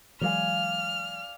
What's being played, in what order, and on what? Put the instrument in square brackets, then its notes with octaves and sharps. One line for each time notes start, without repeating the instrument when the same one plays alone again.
[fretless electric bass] E3 F#3 G#3 [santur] D5 F5 G#5 [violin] F6